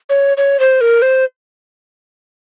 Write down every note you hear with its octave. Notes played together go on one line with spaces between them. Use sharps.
C#5
C#5
C5
A#4
C5